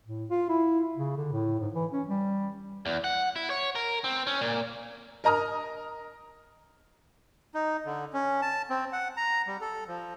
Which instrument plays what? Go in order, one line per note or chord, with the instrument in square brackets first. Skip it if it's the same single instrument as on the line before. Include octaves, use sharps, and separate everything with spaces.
[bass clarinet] A2
F4
E4
C#3
D3
A2
G#2
E3
C#4
G3
[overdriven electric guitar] E2
F#5
E4
C#5
A#4
C4
C#4
A#2
[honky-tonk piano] A#4 D#5 A#5 D#6 F6
[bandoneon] D#4
D3
C#4
A5
C4
F#5
A#5
G3
A4
F3